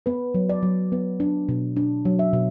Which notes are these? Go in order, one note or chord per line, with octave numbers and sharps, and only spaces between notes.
B3 B4
F#3
D5
F#3
B3
D4
B2
D4
F#3
E5
B2